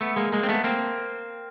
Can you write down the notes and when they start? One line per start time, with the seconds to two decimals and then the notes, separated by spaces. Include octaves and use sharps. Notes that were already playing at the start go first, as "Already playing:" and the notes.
0.01 A3 B3
0.16 G#3 A#3
0.32 G#3 A#3
0.43 C4
0.49 A3 B3
0.64 A#3 C4